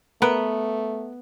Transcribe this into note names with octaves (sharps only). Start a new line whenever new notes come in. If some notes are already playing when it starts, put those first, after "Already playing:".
A3 B3 A#4 B4 F#5